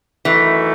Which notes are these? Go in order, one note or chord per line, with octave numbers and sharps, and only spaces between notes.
F#2 D#3 E3 A3